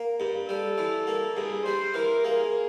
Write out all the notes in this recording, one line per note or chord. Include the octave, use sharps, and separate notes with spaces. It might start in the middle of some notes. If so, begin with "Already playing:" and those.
Already playing: A#3
G2
G3 A4
E3
A#3
G2 G#4
G3 C5
E3 A#4
A#3 G#4